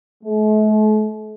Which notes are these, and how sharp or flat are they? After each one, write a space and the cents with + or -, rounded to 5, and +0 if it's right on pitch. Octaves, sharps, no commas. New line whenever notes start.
A3 -45